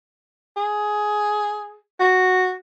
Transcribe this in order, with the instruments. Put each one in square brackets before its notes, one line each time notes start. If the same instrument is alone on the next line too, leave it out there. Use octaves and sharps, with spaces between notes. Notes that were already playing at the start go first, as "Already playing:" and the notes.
[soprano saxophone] G#4
F#4